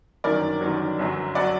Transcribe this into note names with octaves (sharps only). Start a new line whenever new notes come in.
G1 F#2 D#3 F#3 A#4 D5
G1 F#2 D#3 F#3
G1 F#2 F#3
F#3 D5 F#5